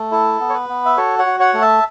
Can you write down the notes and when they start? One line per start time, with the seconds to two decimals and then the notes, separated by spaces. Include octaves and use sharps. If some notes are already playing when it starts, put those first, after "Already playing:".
Already playing: A3
0.11 E4 A4
0.40 B3
0.49 C#5
0.54 B4
0.69 B3
0.85 E5
0.97 F#4 A4 C#5
1.19 C#5 F#5
1.26 F#4
1.40 C#5 F#5
1.54 A3
1.61 E5 A5